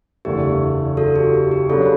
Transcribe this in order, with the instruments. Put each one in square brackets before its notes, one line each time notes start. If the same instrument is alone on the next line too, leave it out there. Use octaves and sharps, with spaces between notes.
[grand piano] F#1 E2 D3 A3 [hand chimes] G4
[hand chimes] F#4 A4
G4
G4
G4
[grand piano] C#3 F#3 B3 D4 [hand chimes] F#4 A4